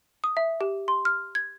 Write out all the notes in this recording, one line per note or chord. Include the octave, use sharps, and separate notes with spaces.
D#6
E5
G4
C6
F6
G#6